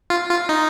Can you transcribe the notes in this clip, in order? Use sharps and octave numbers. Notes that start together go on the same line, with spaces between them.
F4
F4
D#4